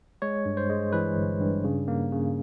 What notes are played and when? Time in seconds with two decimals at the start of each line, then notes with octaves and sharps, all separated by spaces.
0.22 G#3 C#5
0.45 G2
0.57 C5
0.69 G#3
0.93 E3 B4
1.17 G1
1.40 G2
1.64 C#3
1.88 A#3
2.12 C#3